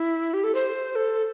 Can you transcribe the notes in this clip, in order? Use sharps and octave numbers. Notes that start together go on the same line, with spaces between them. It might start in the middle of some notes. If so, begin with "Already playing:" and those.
Already playing: E4
G4
A4
C5
A4